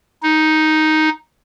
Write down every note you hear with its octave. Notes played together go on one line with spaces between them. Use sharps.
D#4